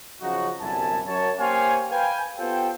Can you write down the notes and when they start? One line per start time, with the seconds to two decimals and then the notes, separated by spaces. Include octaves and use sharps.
0.21 C#3 F3 F#3 D#4 F#4
0.60 G1 C2 F#2 E4 G#5 A5
1.06 F#2 C#5 A5
1.38 A#3 G4 C5 C#5 F5 G#5
1.90 B4 F5 G5 G#5
2.38 B3 F4 G4 A4 C5 G5